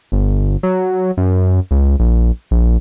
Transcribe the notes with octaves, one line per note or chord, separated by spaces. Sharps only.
G1
F#3
F#2
C#2
A#1
A#1